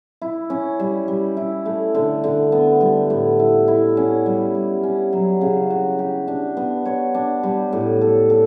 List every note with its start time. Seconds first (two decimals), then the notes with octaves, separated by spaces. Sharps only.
0.22 E4
0.50 C#4
0.79 G3
1.08 G3
1.37 E4
1.66 A3
1.94 D3
2.24 D3
2.52 B3
2.81 G3
3.10 A2
3.39 E4
3.68 E4
3.97 C#4
4.26 G3
4.54 G3
4.83 C#4
5.13 F#3
5.41 C#3
5.70 F#4
5.99 G4
6.28 D4
6.57 B3
6.85 C#5
7.14 D4
7.43 G3
7.73 A2
8.01 A4
8.30 A4